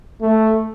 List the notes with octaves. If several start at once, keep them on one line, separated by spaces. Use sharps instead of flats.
A3